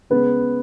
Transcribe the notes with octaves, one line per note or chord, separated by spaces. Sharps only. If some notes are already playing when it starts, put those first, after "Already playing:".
C#3 G#3 B3 B4